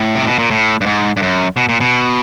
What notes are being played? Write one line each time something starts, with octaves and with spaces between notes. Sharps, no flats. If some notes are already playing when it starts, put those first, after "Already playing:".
Already playing: A2
C3
B2
A#2
A2
G2
G#2
G2
F#2
B2
A#2
B2